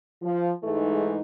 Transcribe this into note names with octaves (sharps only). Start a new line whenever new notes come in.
F3
G#2 E3 G#3 A3 D#4